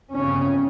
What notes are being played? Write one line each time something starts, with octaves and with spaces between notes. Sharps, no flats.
G1 F2 C#3 C#4